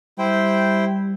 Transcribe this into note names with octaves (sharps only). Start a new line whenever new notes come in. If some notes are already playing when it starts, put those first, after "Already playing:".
G3 E4 C5 G5